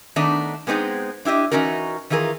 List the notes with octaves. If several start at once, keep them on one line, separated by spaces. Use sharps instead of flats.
D#3 A3 B3 D4 D#4
G#3 B3 C4 D#4 G#4
D4 E4 G4 D#5
E3 G3 C#4 D#4 F#4 A#4
D#3 E3 F4 G#4 A#4